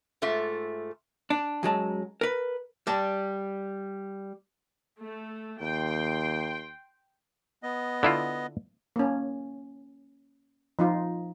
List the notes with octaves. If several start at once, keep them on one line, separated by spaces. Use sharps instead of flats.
G#2 A3 F4 E5
D4
F#2 F#3 G#3 A5
A#4 B4
G3 D5 A5
A3
D#2 G5 C6
B3 D#5
D3 E4 F4
A#3 C#4
F3 D#4 F4